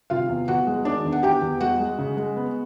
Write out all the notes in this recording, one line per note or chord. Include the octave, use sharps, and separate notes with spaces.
C3 F4 F5
E2
E2 F#4 F#5
G#3
D#3 D4 D5
E2
F#5
E2 G4 G5
E2
G#3 F#4 F#5
G#3
C#3
G#3
B3